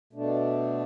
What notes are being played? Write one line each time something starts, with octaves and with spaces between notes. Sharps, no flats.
B2 A3 D4